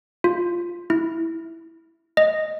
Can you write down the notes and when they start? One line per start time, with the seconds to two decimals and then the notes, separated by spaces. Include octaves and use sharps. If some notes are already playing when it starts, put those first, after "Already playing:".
0.24 F4
0.90 E4
2.17 D#5